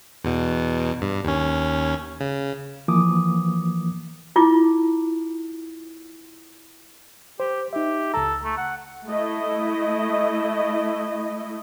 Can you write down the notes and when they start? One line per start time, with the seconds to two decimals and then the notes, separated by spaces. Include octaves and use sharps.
0.24 E2 B2
1.02 G2
1.24 D#2 C#4
2.20 C#3
2.88 E3 F3 A#3 D6 D#6
4.36 E4 F4 D6
7.40 G4 C5
7.73 D#4 G4 E5
8.14 C#2 A4 A#5
8.44 A3
8.58 F#5
9.08 A3 E4 D#5